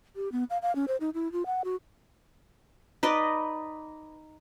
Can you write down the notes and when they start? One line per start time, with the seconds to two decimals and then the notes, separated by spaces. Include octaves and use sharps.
0.16 G4
0.32 B3
0.50 F5
0.62 F5
0.76 C#4
0.88 C5
1.00 D#4
1.14 E4
1.32 F4
1.46 F#5
1.64 F#4
3.03 D#4 B4 D5 D#5